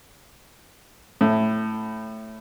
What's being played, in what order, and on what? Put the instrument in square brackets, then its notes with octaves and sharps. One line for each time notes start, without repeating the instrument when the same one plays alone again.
[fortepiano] A2